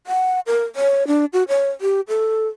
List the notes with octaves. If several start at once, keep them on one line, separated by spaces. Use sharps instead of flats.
F#5
A#4
C#5
D4
F#4
C#5
G4
A4